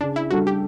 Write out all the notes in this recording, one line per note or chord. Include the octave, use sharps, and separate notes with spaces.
C#3 D4
E4
G3 D4 F#4 A4
G4